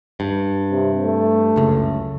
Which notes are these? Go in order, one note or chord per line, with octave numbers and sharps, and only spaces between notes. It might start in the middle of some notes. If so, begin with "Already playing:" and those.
G2
C3
A3
F#1 C#2